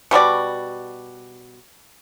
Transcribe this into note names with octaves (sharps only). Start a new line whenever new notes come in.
B2 G3 F#4 D5